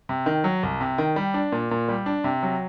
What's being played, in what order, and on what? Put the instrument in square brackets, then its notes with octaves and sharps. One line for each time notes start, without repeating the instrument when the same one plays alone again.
[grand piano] C3
D#3
F#3
C2
C3
D#3
G3
D4
A#2
A#2
G3
D4
C3
F#3